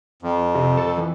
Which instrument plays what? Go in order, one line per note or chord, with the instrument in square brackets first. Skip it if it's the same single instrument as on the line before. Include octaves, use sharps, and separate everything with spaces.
[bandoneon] F2
[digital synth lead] C3
A4
E3